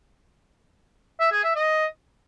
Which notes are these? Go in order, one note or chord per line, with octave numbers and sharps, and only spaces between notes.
E5
G#4
E5
D#5